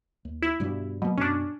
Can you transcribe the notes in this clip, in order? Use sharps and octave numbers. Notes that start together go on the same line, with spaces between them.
D#2
E4
G2 B2 G3
B2 F#3 A#3
F#2 B2 C#4 D4